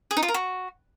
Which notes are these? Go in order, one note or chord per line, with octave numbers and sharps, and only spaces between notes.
G#4
D#4
F4
A#4
F#4